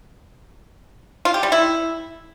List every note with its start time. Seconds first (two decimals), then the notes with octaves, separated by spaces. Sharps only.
1.25 F4
1.34 G4
1.43 G3
1.52 E4